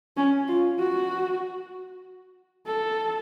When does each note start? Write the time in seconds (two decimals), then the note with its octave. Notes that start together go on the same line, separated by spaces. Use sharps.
0.17 C#4
0.48 F4
0.79 F#4
2.67 A4